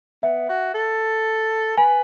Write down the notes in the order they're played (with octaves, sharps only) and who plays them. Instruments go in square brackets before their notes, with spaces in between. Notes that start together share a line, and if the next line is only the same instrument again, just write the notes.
[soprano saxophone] B3 [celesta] E5
[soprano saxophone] F#4
A4
[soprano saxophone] B4 [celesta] G#5